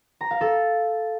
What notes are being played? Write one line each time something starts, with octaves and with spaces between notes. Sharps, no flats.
A#5
F5
A4